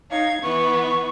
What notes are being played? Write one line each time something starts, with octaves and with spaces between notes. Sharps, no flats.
D#4 C#5 F5 G#6
E3 B3 C#6